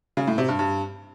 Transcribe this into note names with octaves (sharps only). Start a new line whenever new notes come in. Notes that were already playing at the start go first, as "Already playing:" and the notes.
C#3
A2
C3
G2
G2